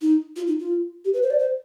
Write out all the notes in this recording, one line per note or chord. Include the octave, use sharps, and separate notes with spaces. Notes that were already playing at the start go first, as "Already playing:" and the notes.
D#4
F4
D#4
F4
G4
B4
C5
D5
C5